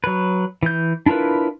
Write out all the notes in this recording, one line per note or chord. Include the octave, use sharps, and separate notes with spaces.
F#3 B4
E3 G6
D4 E4 F4 A#4 B4